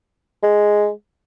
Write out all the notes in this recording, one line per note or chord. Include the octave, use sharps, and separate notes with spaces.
G#3